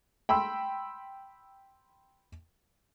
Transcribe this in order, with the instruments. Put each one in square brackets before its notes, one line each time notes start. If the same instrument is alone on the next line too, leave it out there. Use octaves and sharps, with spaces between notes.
[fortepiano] G5 B5 C6 E6